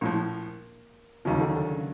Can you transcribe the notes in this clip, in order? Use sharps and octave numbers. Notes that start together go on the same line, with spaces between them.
A#1 A2 F3 A#3
D#2 C#3 F3 F#3
D#3
D3
D3
C#3